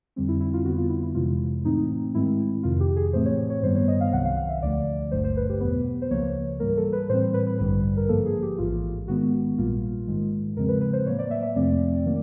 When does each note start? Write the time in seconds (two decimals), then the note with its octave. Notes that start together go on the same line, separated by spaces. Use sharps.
0.16 F2 D3 G3 C4
0.28 E4
0.41 E4
0.53 F4
0.65 F2 D3 G3 B3 F#4
0.78 F4
0.90 E4
1.03 E4
1.14 F2 C3 E3 G#3 F4
1.64 A2 E3 A3 C4 D#4
2.14 G#2 D#3 G#3 C4 E4
2.63 F2 C3 D#3 F4
2.80 G4
2.96 G#4
3.13 A2 E3 A3 C4 C5
3.26 C#5
3.50 C#5
3.62 G2 D#3 G3 B3 C5
3.75 C#5
3.88 D#5
4.01 F5
4.12 C2 C3 D#3 F#3 F#5
4.25 F5
4.37 F5
4.49 E5
4.62 D2 D3 F3 A3 D5
5.11 G#1 G2 D3 F#3 A3 C5
5.24 C5
5.37 B4
5.49 G4
5.60 E2 B2 F#3 B3 B4
6.02 C5
6.10 C#2 C#3 F3 A#3 C#5
6.60 G#2 E3 G3 A#3 A#4
6.77 A4
6.93 B4
7.09 A2 E3 G3 C4 C5
7.34 B4
7.47 B4
7.59 A1 G2 D3 G3 B4
7.97 A#4
8.08 G#2 F3 A#3 A4
8.25 G#4
8.42 G4
8.58 A1 G#2 E3 F4
9.08 G#2 D#3 G#3 B3 F#4
9.58 A#1 A#2 G3 A#3 F4
10.08 G#2 D#3 G#3
10.56 E2 C#3 F3 G#3 C4 A#4
10.68 B4
10.81 B4
10.93 C5
11.06 A2 F#3 A#3 C#5
11.19 D5
11.31 E5
11.43 E5
11.56 F2 C3 F3 A3 C4 D5
12.06 D#3 F#3 A#3